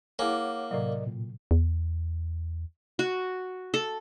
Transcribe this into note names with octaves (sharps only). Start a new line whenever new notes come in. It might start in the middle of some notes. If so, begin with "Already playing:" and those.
A#3 E4 G#4 C#5 F#5 G#5 D6
A2 C3 F#3 A#4 D5 D#5
A#2
E2
F#4
A4